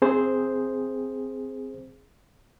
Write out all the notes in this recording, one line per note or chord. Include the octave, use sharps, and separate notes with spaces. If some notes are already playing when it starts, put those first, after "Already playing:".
C4 G#4 C5